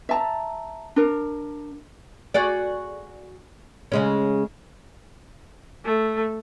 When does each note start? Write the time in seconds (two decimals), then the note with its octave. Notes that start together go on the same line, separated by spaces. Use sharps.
0.09 E5 A5 A#5
0.96 D4 A#4
2.34 F#4 G#4 D5
3.92 C#3 G#3 C#4
5.85 A3